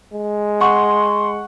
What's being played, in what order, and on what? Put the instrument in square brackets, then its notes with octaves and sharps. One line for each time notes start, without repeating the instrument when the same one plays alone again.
[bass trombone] G#3
[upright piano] F#5 C#6 [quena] C6